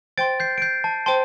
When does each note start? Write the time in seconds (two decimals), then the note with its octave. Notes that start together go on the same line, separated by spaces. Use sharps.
0.18 C5 G5 C6 A6 D7
0.40 G6 C7
0.58 D7
0.62 G6 C7
0.84 A5
1.06 C5 G5 A5 C6